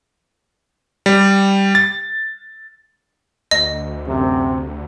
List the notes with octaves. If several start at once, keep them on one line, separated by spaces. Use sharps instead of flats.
G3
A6
D2 D#5
F#2 C3